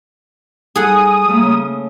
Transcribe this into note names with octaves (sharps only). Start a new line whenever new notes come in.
G3 G#4 A4 F#5 D#6
G3 A3 A#3
C#3 A3